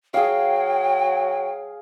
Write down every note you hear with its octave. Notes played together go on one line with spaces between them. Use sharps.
F#3 G#4 F5 G5